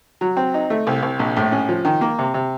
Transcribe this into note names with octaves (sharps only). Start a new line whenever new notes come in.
F#3
C4
D#4
A3
C2
C2
A#1
A2
C#4
F3
D#3
A#3
C3
C3